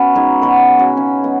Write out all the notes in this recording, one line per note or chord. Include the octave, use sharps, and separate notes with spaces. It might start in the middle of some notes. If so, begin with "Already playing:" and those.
Already playing: B3 C#4 F#4
G#3 D#4 G#4
B2 F#4 B4
G#3
C#4 F#4
C#3 C#4
G#3 B3